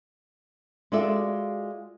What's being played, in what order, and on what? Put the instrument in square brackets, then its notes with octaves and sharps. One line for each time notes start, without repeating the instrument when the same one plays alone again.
[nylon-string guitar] G#3 F4 F#4 A4 D5 E5